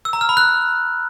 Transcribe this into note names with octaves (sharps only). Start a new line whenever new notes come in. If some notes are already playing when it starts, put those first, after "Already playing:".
E6
A#5
F6
B5
F#6